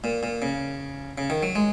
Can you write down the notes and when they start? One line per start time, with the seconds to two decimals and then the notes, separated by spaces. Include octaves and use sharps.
0.04 A#2
0.23 A#2
0.42 C#3
1.18 C#3
1.30 D#3
1.43 F#3
1.55 G#3